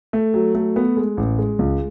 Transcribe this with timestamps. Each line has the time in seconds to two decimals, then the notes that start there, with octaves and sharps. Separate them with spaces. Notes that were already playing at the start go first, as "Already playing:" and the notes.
0.13 A3
0.34 F#3
0.55 A3
0.76 B3
0.97 G#3
1.17 A1
1.38 G#3
1.59 C#2